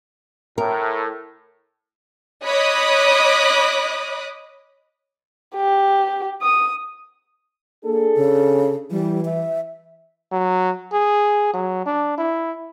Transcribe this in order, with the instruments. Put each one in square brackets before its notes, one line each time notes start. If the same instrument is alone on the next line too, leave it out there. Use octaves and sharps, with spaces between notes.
[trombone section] A2 [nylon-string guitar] A#4
[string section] C#5 D#5 B5 D6 D#6 F#6
[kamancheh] G4
D#6
[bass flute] A#3 [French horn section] D4 G#4 A4
[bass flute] C#3
[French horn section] E3 [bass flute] G3
[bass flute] E5
[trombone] F#3
G#4
F#3
D4
E4